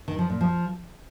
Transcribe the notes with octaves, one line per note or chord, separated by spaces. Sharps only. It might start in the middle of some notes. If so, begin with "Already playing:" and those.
D#3
F3
A#2
F3